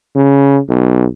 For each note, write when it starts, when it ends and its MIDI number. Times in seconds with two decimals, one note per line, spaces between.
0.16 0.59 49
0.69 1.05 35